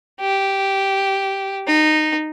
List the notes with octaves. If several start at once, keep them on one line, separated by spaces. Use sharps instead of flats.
G4
D#4